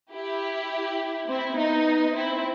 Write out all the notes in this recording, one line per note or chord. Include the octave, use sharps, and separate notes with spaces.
E4 G4
C4 E4
B3 D#4
C4 E4